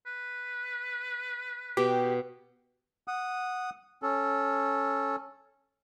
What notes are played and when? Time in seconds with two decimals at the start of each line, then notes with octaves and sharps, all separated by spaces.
0.07 B4
1.77 B2 G4
3.08 F#5 D#6
4.02 C#4 A4